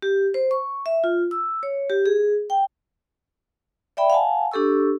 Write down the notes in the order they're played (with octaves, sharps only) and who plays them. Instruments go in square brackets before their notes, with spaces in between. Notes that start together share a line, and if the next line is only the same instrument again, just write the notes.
[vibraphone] G4
C5
C#6
E5
F4
E6
C#5
G4
G#4
G5
D5 E5 G5 B5
F5 F#5 G#5 A5
D4 G4 A4 C#6 E6